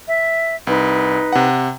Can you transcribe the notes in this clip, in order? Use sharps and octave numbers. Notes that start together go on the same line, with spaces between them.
E5
C2 D#4 B4
C3 F#5